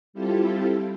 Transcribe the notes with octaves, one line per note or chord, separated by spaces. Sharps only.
G3 C4 E4 F4 G4 A4